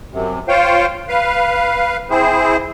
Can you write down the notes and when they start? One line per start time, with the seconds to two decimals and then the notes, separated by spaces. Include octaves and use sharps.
0.12 F#2 C3
0.48 F4 C5 C#5 F5 G5
1.08 B4 F5
2.10 C4 E4 G#4 C5